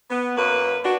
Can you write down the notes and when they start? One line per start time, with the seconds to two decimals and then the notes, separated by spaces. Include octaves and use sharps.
0.10 B3
0.37 F#2 A#3 B4
0.84 D4 F#4